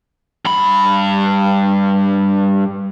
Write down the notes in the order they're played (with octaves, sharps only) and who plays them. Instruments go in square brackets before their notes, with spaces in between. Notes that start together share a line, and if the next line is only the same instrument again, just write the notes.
[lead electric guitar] G2 B5